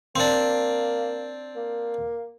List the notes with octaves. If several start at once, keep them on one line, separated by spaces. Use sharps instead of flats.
A#3 C4 D4
A#3